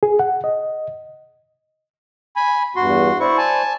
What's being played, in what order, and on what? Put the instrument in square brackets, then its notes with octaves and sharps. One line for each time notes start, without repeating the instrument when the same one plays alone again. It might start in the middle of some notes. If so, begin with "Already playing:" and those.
[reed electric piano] G#4
F#5
D#5
[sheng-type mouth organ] G#5 B5
[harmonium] E2 G2 [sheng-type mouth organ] F#4 C6
[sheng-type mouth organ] E4 C#6 [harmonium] C5 D5
[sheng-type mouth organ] G#5 A5